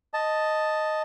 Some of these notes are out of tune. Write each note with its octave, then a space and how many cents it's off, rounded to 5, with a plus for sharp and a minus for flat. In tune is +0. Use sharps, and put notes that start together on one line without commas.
D#5 +0 A5 +0